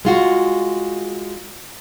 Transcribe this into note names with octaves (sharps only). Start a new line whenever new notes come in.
G#3 F4 F#4